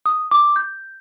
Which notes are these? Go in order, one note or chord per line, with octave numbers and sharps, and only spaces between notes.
D#6
D6
G6